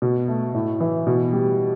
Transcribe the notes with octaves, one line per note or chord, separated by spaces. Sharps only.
B2
A3
A2
E3
B2
G3